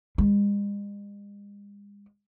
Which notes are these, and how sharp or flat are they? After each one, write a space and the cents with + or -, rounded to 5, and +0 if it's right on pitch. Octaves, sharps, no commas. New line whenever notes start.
G#3 -45